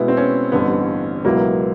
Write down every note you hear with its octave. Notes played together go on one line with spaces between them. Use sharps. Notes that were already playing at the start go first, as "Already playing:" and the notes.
Already playing: B2 G#3 B3 E4
C4
C#4
A1 G2 D3 B3
C#2 B2 F#3 A#3 B3 E4